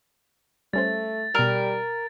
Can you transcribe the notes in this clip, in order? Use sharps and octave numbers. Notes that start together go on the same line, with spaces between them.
G3 A3 C#4 C5 A6
B2 G3 A#4 E6